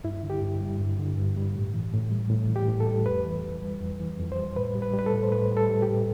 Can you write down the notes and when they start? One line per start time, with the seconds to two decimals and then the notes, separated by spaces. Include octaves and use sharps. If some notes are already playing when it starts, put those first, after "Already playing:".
0.04 G2 E4
0.23 D3
0.30 G4
0.42 G2
0.61 G3
0.80 G2
0.99 D3
1.17 G2
1.37 G3
1.55 A2
1.74 E3
1.93 A2
2.11 G3
2.30 A2
2.49 E3
2.56 G4
2.68 A2
2.80 A4
2.87 G3
3.06 F2 B4
3.24 E3
3.44 F2
3.62 G3
3.81 F2
4.00 E3
4.19 F2
4.32 C5
4.38 G3
4.56 A2 B4
4.75 G3
4.82 B4
4.94 G3
4.99 B4
5.06 A4
5.13 A2
5.23 C5
5.32 A2 B4
5.51 G3
5.57 A4
5.69 G3
5.82 G4
5.89 A2